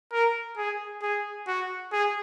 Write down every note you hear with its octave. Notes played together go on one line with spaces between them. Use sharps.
A#4
G#4
G#4
F#4
G#4